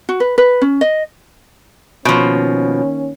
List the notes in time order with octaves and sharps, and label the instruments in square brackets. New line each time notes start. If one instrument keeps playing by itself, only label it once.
[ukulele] F#4
B4
B4
C#4
D#5
[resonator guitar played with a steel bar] B2 F3 [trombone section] D#3 A#3 C#4